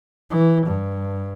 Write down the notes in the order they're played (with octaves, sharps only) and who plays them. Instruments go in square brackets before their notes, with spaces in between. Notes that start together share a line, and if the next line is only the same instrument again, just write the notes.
[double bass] E3
G2